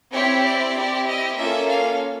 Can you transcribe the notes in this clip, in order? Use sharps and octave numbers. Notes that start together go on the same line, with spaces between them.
C4 E4 G4 C#5
D5
C4 E4 G4
D#5
A#3 C#4 F4 A4 E5
F5